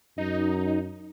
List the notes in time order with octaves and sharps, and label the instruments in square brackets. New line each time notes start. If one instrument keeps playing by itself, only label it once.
[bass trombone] F#2 [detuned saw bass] D#4